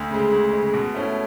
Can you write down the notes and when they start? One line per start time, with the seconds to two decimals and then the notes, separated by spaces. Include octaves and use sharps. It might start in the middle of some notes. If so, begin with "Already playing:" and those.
Already playing: D2
0.11 C#3 G#3
0.32 D2
0.53 C#3 G#3
0.74 B2
0.94 A3 C#4 E4